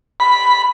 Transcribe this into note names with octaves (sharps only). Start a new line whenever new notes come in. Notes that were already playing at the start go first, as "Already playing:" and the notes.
B5